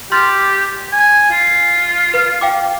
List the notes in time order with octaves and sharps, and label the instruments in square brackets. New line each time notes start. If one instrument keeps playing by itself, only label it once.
[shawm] G4 [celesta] C6 F6 A6
[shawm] G#5
F4
[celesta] B4 F6
F5 G5 D6